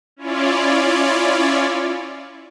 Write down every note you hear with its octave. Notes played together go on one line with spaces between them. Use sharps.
C#4 E4 F4 C#5 D5